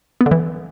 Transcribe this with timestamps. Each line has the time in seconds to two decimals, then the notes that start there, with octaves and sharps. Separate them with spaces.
0.21 B3
0.26 D3
0.31 E3